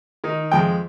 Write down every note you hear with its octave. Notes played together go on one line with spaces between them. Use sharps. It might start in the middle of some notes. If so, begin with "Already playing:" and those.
D#3 D#4
F2 G#3 G5